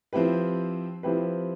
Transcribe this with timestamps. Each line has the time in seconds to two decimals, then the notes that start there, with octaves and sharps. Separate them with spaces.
0.13 F3 C4 E4 G4 B4
1.03 F3 C4 E4 G4 B4